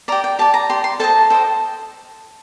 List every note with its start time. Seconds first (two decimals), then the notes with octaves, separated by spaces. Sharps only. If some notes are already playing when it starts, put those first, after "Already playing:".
0.08 G4 D5 A#5
0.24 G5
0.39 G4 D5 A5
0.54 A#5
0.69 G4 D5 C6
0.84 C6
1.00 A4 C5 D#5 A5
1.30 A4 C5 D#5 G5